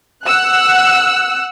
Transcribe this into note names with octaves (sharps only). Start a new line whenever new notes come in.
F#5 E6 F#6